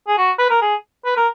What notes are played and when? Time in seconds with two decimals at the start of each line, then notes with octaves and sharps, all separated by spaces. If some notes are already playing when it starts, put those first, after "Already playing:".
0.08 G#4
0.18 F#4
0.39 B4
0.50 A#4
0.62 G#4
1.05 B4
1.17 A#4